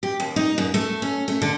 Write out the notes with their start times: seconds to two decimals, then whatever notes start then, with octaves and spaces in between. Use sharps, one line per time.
0.03 G4
0.20 D#2
0.36 D#4
0.58 F#2
0.74 A3
1.02 C#4
1.28 A3
1.42 D3